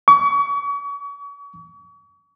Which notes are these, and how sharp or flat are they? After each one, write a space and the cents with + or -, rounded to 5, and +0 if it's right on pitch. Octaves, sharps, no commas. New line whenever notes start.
C#6 +40